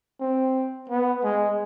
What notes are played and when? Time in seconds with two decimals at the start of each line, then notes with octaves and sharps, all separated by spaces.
0.21 C4
0.90 B3
1.24 G#3